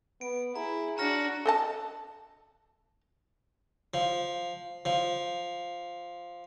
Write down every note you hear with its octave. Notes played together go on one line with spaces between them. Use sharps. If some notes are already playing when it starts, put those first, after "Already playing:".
B3 D7
E4 G#4 A#5
D4 F#4 A#5 F6 A#6
A4 D#5 A5
F3
F3